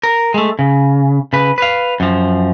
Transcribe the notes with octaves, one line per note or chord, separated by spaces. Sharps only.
A#4
G#3 A3
C#3
C#3 B4
B4 F5
F#2 F3